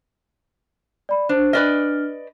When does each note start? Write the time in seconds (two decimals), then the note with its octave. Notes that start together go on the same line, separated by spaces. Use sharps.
1.09 D5 B5
1.29 D4 C5
1.53 D4 B4 D5 D#5 F6